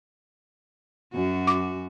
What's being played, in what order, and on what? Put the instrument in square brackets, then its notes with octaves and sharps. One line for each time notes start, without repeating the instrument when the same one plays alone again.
[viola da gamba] F#2 F#4
[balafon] D6